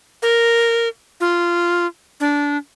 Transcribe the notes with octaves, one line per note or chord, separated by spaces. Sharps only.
A#4
F4
D4